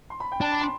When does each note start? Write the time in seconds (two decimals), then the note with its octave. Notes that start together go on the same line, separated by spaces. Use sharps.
0.10 C6
0.20 B5
0.32 G5
0.41 D4 A5
0.52 B5
0.61 C6